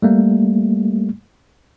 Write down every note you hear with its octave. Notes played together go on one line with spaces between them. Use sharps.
G3 A3 A#3